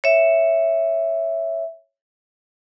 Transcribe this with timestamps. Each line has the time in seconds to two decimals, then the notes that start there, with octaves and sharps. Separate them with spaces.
0.04 C#5 E5